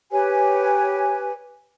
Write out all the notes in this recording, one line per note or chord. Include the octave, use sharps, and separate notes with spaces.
G4 B4 C#5 G#5